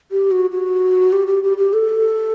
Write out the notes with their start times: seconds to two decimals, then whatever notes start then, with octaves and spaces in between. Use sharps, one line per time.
0.11 G4
0.31 F#4
0.51 F#4
1.13 G4
1.27 G4
1.44 G4
1.58 G4
1.73 A4